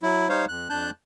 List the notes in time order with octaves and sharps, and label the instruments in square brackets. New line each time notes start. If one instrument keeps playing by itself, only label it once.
[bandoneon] F#3 E4
G3 D#4 C5 C#5 F5
F2 F#6
F2 D4 A5 F#6 G6